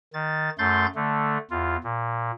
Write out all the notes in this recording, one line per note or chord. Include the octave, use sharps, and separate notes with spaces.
D#3 A6
F#2 A3 C6 G6 A6
D3 A3
E2 F4
A#2